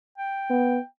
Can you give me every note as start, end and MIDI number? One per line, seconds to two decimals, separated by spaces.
0.18 0.85 79
0.50 0.78 59